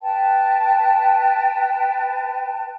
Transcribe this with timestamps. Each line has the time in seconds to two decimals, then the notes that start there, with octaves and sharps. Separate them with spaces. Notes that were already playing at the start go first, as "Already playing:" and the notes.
0.01 B4 G5 A5